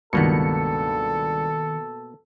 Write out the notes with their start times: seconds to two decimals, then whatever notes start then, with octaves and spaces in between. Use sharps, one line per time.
0.13 C#2 G2 B2 D#3 A#3 B3 A4 C#7